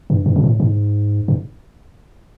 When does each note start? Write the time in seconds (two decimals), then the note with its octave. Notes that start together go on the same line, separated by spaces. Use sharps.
0.10 G2
0.26 G2
0.36 A#2
0.44 A2
0.60 G#2
1.28 G2